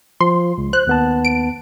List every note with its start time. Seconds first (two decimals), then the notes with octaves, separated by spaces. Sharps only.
0.21 F3 C6
0.58 C#2
0.73 C5 F#6
0.87 D#2 B3 A5
1.25 D7